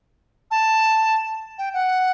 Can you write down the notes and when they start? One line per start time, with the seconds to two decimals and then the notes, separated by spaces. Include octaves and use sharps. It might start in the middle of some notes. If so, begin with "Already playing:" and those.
0.51 A5
1.58 G5
1.74 F#5